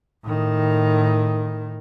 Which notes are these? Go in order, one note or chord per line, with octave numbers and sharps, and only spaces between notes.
A2 D#3